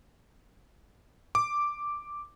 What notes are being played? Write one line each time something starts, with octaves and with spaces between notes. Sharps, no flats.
D6